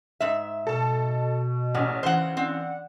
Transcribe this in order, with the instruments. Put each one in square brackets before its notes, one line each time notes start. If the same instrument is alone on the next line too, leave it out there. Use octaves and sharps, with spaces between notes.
[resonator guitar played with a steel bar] G#2 E5
[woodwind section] B2 [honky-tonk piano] A4 A5
[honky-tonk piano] A1 C#4 [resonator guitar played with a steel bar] A#2
[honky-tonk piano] C#3 E3 [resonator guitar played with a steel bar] C5 F#5
[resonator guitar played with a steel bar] C4 [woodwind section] D5 F#5